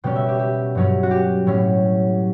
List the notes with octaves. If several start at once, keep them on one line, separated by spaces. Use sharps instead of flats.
B2 G3 C#4 G5
E5
G4
G4
G2 F#3 C#4
F#4
G4
A2 F#3 C#4